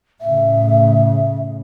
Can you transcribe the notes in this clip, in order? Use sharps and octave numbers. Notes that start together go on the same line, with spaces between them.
A2 C#3 E5